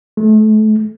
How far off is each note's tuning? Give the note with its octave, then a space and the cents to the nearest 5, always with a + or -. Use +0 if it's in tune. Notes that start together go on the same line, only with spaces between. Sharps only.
A3 -35